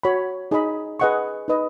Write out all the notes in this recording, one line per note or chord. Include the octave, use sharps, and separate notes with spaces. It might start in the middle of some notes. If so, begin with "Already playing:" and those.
F#4 C#5 B5
D#4 G#4 D#5 B5
G#4 B4 D#5 F#5 C#6
D#4 B4 D#5